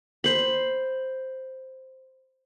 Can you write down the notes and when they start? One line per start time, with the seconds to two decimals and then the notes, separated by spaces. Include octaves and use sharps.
0.24 C5 B5